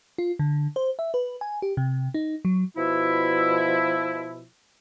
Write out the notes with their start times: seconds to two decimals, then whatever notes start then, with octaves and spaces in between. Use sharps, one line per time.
0.18 F4
0.39 D3
0.76 C5
0.99 E5
1.14 B4
1.41 G#5
1.62 G4
1.77 C3
2.14 D#4
2.45 F#3
2.76 B2 F3 E4